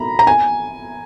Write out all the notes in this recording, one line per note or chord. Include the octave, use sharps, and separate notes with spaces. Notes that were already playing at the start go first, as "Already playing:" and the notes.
Already playing: A#5 B5
A#5
G#5